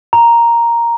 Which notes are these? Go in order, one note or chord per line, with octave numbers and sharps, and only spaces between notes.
A#5